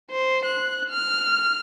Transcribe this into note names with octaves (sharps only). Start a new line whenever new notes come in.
C5
F#6
F6